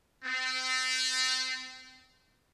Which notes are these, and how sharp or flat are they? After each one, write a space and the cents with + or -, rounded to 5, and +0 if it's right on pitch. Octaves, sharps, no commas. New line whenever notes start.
C4 -25